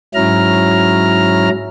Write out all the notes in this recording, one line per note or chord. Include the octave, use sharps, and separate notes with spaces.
G#2 F#3 C#4 E4 A#5 F6